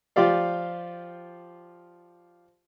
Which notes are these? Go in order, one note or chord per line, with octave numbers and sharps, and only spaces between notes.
F3 F4 G4 D5 F5